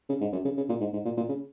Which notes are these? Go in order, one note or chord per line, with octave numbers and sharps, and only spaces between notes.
C#3
G#2
F#2
C#3
C#3
A#2
G#2
G#2
A#2
A#2
C#3